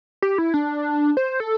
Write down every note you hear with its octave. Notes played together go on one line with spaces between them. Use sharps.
G4
E4
D4
C5
A4